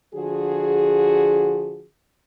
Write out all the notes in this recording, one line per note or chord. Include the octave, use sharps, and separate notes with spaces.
D3 F3 F#4 G#4